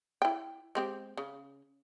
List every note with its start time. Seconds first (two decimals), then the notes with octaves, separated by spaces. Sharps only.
0.22 E4 G5
0.75 G#3 C4 G4
1.17 C#3